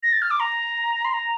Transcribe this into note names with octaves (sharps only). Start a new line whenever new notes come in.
A#6
A6
F6
D6
A#5
C6
A#5